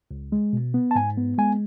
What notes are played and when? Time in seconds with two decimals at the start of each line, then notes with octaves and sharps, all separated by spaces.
0.11 C#2
0.32 G#3
0.53 B2
0.74 B3
0.91 A5
0.95 G#2 G#5
1.18 B3
1.38 G#3 G#5